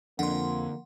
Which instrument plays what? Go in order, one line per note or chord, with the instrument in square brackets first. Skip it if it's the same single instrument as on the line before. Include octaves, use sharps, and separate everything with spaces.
[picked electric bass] F2 [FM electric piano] D3 [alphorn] A#3 [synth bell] F#5 C6